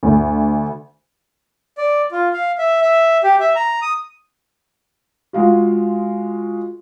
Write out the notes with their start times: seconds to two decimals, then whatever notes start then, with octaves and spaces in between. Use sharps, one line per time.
0.03 D2
1.78 D5
2.12 F4
2.33 F5
2.58 E5
2.82 E5
3.24 G4
3.40 E5
3.56 A#5
3.82 D#6
5.33 G#3 F4 F#4